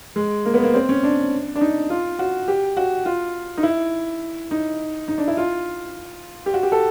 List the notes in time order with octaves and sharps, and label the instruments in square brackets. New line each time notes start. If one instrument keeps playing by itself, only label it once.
[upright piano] G#3
A#3
B3
A#3
C4
C#4
D4
D4
D#4
F4
F#4
G4
F#4
F4
D#4
E4
D#4
D#4
D4
E4
F4
G4
F#4
G4
A4